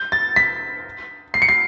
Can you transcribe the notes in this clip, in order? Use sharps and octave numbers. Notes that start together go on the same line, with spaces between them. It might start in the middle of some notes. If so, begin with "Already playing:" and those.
Already playing: G6
A6
B6
C7
C#7
C7